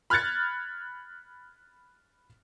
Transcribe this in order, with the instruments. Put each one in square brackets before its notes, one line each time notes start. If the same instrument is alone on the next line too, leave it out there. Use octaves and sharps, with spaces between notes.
[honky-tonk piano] B5 F6 F#6 G#6 A6 C#7